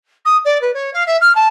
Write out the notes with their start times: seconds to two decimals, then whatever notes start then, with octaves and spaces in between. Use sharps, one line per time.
0.25 D#6
0.45 D5
0.61 B4
0.73 C#5
0.93 F5
1.06 E5
1.21 F6
1.35 A5